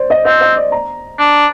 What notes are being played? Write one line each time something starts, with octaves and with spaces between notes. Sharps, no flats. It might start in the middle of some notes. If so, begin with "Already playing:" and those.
Already playing: C5 D5
D#5
C4 D#5
D#5
D5
A#5
D4